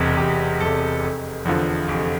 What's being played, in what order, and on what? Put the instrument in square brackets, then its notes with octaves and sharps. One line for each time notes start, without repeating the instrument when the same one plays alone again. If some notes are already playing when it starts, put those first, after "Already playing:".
Already playing: [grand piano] E1 E2 C3
E1 G4
E2 C3 A4
F1
E2 D3 F3
F1